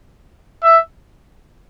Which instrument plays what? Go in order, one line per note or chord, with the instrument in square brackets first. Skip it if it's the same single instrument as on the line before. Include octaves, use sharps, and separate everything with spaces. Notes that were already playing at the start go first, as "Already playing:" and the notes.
[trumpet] E5